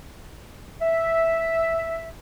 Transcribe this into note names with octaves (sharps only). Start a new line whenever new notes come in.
E5